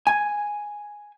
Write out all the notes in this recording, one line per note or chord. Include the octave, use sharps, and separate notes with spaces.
G#5